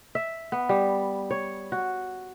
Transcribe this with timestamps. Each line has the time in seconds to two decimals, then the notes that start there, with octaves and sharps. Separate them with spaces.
0.15 E5
0.52 B3
0.69 G3
1.31 C#5
1.72 F#4